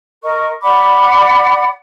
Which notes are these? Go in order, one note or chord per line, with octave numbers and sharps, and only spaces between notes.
A#4 D#5 C#6
D5 F#5 B5 D6